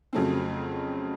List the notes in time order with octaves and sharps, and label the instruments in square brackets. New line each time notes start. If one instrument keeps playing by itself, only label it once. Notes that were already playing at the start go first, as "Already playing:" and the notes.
[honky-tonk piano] F2 C#3 F#3 A3 C4